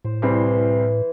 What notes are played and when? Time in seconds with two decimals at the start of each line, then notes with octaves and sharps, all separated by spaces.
0.04 A2 C5
0.22 C2 E3 G3 C4 E4 C6